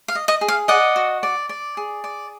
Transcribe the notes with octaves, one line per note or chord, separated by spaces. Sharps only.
F5
D#5
D#5
G#4
F5
D5 D#5 F#5
F#4
D5
D5
G#4
D5